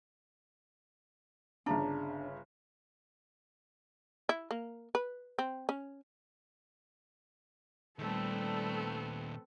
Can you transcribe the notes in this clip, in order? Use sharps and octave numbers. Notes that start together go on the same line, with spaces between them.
G1 C#3 D4 A#5
E4
A#3
B4
C4
C#4
A#2 D#3 G3 A3 B3 C4 A4